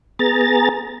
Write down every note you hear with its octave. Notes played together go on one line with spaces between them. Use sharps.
B3 G#4 A#5 A6